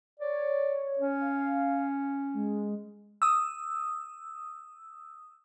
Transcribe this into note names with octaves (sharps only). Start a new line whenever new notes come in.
C#5 D5
C#4
F5
G#3
D#6 E6